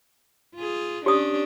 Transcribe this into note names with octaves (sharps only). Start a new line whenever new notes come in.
F4 G#4
C#4 D4 G4 D#6